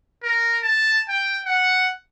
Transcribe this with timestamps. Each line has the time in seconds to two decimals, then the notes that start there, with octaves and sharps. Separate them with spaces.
0.23 A#4
0.63 A5
1.09 G5
1.46 F#5